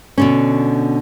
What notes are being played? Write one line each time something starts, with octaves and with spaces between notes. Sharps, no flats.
B2 D3 C#4